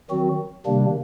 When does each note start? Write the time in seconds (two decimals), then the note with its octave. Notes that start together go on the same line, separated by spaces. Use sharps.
0.10 D#3 F#3 C4 F#4
0.66 C3 D#3 G3 A#3 D4